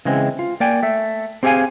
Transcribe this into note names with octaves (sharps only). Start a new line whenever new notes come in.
C#3 E3 G#3 C4
F4
A#3 D5 G5 G#5
A3 E5
C4 G4 G#4 E5 F5 G#5